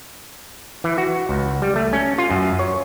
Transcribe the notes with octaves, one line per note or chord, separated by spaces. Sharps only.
E3
F#4
C#2
G3
A3
C#4
F4
F#2
C#5